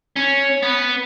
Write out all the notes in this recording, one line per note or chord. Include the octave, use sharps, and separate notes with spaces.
C#4
B3